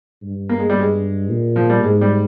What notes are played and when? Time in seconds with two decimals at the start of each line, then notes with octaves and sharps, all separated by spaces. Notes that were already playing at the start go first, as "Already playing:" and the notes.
0.22 G2
0.49 A#3
0.59 G#3
0.70 G3
0.76 G2 G#3
1.30 A#2
1.56 F3
1.70 G3
1.83 G#2 G#3
2.01 G3